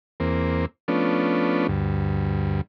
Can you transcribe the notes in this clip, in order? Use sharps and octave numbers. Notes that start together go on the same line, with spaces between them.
E2 A#3 C4
F3 A3 B3 C#4 D4
D2 G2